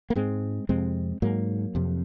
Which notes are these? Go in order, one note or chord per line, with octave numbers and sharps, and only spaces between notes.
A#3
G#2 G#3 C4
F2 C3 G#3 C4
G#2 F#3 A#3
F2 C3